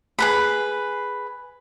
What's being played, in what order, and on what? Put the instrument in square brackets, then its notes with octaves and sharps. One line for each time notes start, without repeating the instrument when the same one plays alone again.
[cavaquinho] G#4 B4 B5